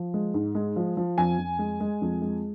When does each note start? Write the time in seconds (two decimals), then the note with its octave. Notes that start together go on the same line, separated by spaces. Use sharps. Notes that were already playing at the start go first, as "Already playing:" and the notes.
Already playing: F3
0.14 G#3
0.34 G#2
0.55 G#3
0.76 F3
0.97 F3
1.18 F2 G#5
1.38 F2
1.59 G#3
1.80 G#3
2.02 F2
2.22 G#3